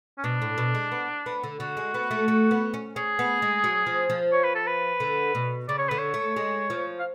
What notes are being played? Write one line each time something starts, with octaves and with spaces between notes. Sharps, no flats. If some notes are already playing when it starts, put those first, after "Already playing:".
C#4
B2 D4
A2
B2
G#3
B3
B3
D3
D3 F#4
G#3
B3
A3
A3
B3
C#4
C#4 G#4
B3
G#3
F#3
F3
F3
C#5
B4
A4
B4
D3
B2
C#3 D5
C#5
D3 B4
C#5
A3
G#3
F3
F5